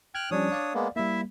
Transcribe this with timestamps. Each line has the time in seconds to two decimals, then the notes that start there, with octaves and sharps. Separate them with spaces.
0.15 G5 F6 F#6 G#6
0.31 F3 G3 C#4 D4 C#5 D#6
0.52 D5 F5
0.74 G#3 A#3 B3
0.96 G3 A#3 E4 E5